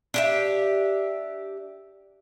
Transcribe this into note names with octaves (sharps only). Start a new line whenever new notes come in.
D4 G4 E5